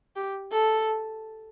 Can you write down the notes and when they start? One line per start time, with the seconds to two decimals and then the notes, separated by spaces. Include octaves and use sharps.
0.16 G4
0.51 A4